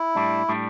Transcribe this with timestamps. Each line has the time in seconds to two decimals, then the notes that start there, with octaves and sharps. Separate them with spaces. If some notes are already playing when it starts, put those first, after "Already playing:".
Already playing: E4
0.15 A2 G3 D4
0.49 A2 G3 D4